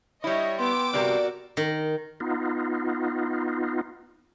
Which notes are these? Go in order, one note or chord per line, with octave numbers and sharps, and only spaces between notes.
G3 E4 C#5 D#5
B3 G5 C6 D6 E6
G2 C3 F#4 G4 A#4 D5
D#3
B3 D#4 F4